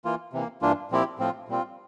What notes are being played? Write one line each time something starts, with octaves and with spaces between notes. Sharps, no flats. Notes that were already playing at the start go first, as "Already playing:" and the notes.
E3 A#3 F4
C3 E3 A#3
G2 E3 A#3 D4 F4
A#2 F3 C4 E4 G4
A2 F3 C4 F4
A#2 G3 C4 F4